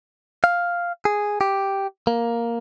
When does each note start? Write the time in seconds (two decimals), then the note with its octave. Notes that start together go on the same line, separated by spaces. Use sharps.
0.44 F5
1.05 G#4
1.41 G4
2.07 A#3